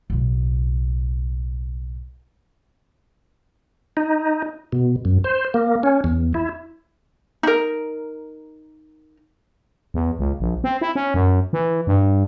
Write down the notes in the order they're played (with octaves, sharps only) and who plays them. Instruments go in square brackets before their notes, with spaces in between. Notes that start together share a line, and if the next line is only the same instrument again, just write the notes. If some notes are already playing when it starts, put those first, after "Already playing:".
[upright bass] B1 A2
[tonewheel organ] D#4
B2
F#2
C5
A#3
C#4
E2
E4
[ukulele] D#4 A#4
[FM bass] E2
C#2
A#1
C4
E4
C#4
F#2
E3
G2